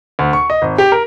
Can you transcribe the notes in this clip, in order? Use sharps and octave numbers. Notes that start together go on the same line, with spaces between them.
D2
C#6
D#5
G#1
G4
A#4